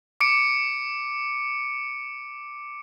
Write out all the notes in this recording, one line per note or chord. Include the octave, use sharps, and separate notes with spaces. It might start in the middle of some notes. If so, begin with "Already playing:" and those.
D6 C#7 D7